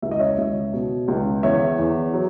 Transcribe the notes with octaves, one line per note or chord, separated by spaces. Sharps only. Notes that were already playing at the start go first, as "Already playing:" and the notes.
C#2 E5
D#5
C#5 E5
C#2
B2
C#2
E2 C#5 E5
E2
F#3